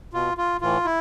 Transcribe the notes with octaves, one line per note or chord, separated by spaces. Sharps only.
B2 F4
F4
A2 E3 F4
E4